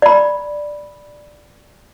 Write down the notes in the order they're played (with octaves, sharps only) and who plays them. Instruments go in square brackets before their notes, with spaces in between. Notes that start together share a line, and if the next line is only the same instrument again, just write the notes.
[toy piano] D5 B5